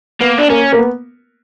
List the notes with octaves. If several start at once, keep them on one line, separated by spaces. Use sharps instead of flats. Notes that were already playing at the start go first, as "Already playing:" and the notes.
A#3 B3
D4
A#3 C#4
A#3
B3